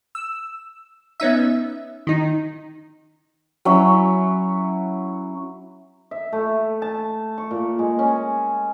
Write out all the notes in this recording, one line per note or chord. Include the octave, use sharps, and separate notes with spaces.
E6
B3 C#4 D#4 E5
D#3 D#4
F#3 C#4 E4
E5
A3
A5
C#6
A#2
G#3
C#4